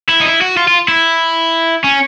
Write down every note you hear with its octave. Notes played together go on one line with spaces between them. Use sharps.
E4
D#4
E4
F#4
F4
F4
E4
C#4